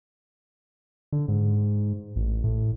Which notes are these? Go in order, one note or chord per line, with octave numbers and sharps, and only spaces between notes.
D3
G#2
A1
A2